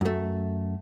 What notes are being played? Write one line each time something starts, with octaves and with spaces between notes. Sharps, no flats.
F#2 A3